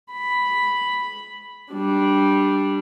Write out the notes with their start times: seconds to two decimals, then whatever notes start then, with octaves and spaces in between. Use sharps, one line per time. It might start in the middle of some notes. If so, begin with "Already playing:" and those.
0.13 B5
1.73 G3 D4